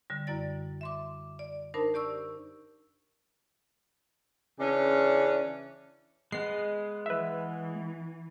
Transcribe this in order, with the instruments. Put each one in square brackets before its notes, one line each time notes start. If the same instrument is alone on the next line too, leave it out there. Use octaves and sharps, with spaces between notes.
[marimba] D3 G3
F#2 G3 E4 D5 A6
E5 C6 D6
D5
D4 D#4 A#4 C5 A5 B5
G4 D5 C#6 E6
[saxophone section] C#3 E3 C#4 D4
[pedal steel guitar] G#3 B3 [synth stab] C7
[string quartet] E3 [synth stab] B4 E5